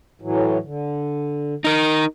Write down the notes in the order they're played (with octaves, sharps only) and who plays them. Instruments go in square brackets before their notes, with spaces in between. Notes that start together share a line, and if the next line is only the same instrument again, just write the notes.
[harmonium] A2 E3 F#3
D3
[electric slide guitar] D#4 A#4